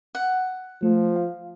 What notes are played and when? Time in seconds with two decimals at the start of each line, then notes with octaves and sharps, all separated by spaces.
0.15 F#5
0.83 F3 A3
1.16 F5